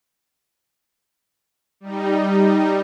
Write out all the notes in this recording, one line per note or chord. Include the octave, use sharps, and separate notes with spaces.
G3 D#4